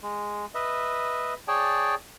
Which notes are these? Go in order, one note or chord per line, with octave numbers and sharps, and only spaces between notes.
G#3
B4 D#5 E5
G#4 C#5 D5 G5 A5